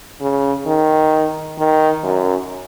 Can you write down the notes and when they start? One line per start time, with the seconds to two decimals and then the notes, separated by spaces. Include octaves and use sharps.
0.21 C#3
0.66 D#3
1.58 D#3
2.04 F#2